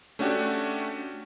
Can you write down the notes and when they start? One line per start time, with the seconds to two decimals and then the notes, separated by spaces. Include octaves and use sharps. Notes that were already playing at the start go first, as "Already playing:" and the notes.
0.19 A3 C#4 D4 F#4 G4